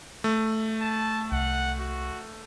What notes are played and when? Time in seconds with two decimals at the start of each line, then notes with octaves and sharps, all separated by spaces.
0.24 A3
0.81 A5
1.32 C2 F#5
1.80 F#4